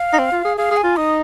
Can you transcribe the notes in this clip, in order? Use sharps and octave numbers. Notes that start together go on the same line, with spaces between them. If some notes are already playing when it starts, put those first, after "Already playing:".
Already playing: F5
D#4
C4
F4
G#4
G#4 F5
G#4
G#5
F4
D#4 D#6